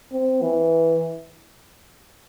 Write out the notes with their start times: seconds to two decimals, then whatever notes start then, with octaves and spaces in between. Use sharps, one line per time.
0.13 C4
0.42 E3